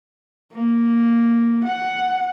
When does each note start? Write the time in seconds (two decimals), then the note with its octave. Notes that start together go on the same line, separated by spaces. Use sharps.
0.53 A#3
1.65 F#5